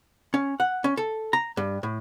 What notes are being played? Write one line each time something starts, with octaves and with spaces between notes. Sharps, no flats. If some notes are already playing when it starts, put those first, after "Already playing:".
C#4
F#5
C#4
A4
A#5
G2
A2